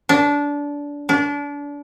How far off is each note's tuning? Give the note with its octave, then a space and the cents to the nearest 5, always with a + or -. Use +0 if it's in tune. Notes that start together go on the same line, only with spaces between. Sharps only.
D4 -20
D4 -30